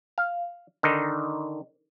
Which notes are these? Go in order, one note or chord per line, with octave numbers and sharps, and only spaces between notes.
F5
D3 D#3 D#4